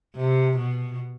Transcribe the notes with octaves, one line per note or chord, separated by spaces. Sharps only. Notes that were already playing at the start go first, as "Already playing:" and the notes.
C3
B2